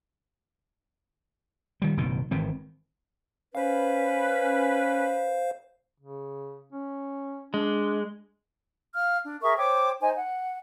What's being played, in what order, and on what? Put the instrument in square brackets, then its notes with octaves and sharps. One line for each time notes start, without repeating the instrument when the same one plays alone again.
[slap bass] D#3 G3
F#1 B2 D#3
G#1 D#3 E3 C4
[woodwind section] C#4 B4 [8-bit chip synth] C5 F5
[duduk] C#3
C#4
[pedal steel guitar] G#3 [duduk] D4
[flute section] F5 F6
D4
G#4 A#4 E5 C#6
C5 C#5 G5 D6
D#4 C5 D#5 G#5
F#5